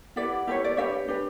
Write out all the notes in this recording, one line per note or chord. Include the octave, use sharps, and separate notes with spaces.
E4 G4 B4 D5 F#5
E4 G4 B4 C#5
D5
D4 G4 B4 C#5 E5
D4 G4 B4